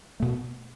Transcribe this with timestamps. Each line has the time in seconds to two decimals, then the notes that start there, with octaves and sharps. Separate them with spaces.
0.20 B2 A3